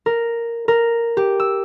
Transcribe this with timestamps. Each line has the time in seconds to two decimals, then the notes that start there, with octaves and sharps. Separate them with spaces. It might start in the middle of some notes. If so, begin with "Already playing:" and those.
0.06 A#4
0.68 A#4
1.17 G4
1.40 E6